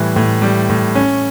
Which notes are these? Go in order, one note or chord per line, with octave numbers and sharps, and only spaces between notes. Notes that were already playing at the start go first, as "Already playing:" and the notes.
Already playing: A2 E3 G3
A2
G3
A2
C#4